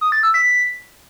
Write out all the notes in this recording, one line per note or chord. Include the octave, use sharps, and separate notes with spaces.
D#6
A6
E6
B6